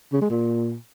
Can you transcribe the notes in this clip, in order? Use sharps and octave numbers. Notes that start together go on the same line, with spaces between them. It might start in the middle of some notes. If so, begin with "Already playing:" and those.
C#3
G#3
A#2